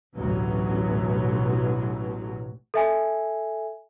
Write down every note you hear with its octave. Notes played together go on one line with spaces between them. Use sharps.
A1 D2 B2 F#3
A4 E5 G#5